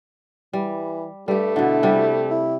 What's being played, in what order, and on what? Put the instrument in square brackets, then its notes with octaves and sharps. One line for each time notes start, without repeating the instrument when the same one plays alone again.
[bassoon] E3 [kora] G3
[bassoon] G2 [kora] G3 G4 [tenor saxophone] A3
[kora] B2 D3 [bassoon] E4
[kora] C3 G3
[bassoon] E4